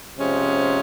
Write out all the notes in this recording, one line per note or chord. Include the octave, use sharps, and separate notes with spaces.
C3 F3 G#3 C#4